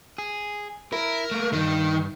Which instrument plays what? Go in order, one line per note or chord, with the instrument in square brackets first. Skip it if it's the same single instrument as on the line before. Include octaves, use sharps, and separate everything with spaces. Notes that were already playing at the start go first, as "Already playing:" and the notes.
[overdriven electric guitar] G#4
[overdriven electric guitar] E4 [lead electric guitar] A#4
[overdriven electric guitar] A3 A#3
[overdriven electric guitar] E2 G2 [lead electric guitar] D#3